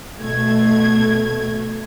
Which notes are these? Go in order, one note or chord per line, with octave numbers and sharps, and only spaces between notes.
B2 A3 G#6